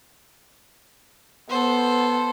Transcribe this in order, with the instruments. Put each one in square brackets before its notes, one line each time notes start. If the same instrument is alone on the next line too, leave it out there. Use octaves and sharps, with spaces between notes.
[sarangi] B3 [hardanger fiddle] A4 C5